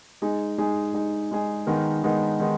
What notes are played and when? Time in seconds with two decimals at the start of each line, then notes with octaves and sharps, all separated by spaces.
0.22 G#3 D#4 G#4
0.58 G#3 D#4 G#4
0.94 G#3 D#4 G#4
1.31 G#3 D#4 G#4
1.67 D#3 G#3 B3 D#4 A#4
2.03 D#3 G#3 B3 D#4 A#4
2.40 D#3 G#3 B3